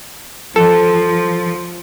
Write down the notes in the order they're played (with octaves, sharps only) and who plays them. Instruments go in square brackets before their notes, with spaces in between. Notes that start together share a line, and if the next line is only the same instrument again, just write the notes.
[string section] F3 [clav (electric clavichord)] A4